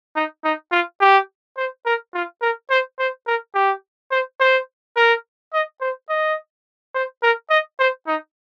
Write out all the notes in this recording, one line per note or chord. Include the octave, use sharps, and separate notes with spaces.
D#4
D#4
F4
G4
C5
A#4
F4
A#4
C5
C5
A#4
G4
C5
C5
A#4
D#5
C5
D#5
C5
A#4
D#5
C5
D#4